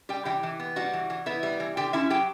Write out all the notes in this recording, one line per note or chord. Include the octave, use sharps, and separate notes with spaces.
G3 G4 G5
E3 G4 G5
E3
B3
G3 F#4 F#5
E3
E3
B3 E4 E5
G3
E3
D3 G4 G5
C#4 E4 E5
F#3 G4 G5